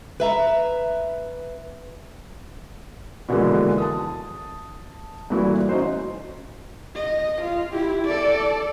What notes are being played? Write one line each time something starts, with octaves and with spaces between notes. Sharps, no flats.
B4 E5 A#5
B2 D3 E3 F3 G#3 A#3
A5 D#6
G2 A#2 E3 A3 E4 F#4
C#4 D#4 F#4 C5
D#5
F4
E4 G4
A4 D5